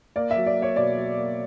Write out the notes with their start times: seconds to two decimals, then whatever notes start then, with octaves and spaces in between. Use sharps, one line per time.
0.16 A#3 D5
0.31 E5
0.36 F#3
0.46 D5
0.57 A#3
0.62 C#5
0.76 B2 D5
0.97 F#3
1.17 A#3